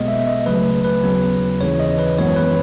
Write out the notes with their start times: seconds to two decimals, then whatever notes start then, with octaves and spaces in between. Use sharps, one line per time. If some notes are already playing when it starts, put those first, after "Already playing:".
Already playing: B1 B2 G#3 B3 D#5
0.08 E5
0.27 D#5
0.46 C#2 C#3 F#3 A3 B4
0.84 B4
1.03 D#2 C#3 F#3 B3
1.61 D#2 C#3 E3 C#5
1.80 D#5
1.99 B4
2.18 G#1 F#2 E3 G#3 B3 C#5
2.36 B4